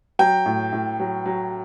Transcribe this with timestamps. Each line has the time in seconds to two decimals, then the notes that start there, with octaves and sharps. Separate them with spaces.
0.19 F#3 G5
0.46 A2
0.73 A2
1.00 F#3
1.26 F#3